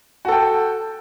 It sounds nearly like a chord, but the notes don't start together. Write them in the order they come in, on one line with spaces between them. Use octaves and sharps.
F#4 A4 G5